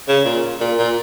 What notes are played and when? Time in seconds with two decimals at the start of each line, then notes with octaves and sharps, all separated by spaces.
0.08 C#3
0.25 A#2
0.60 A#2
0.78 A#2